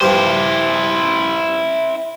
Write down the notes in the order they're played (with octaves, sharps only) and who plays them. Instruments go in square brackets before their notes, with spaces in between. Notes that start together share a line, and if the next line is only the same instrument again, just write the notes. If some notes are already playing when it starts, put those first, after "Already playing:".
[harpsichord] G2 F3 [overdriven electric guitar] E4 C5